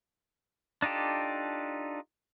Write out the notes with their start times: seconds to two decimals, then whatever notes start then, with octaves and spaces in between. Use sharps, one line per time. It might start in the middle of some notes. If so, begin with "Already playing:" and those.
0.82 D4 D#4 F4 G4 A4